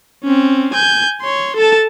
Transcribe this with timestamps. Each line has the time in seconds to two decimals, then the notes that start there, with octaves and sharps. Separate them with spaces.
0.24 C4 C#4
0.74 G#5 G6
1.21 C#5 C6
1.56 A4 A5